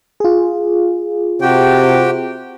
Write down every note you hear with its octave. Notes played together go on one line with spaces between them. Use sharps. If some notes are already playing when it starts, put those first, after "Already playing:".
F4 G#4
C3 F#4 G4 G5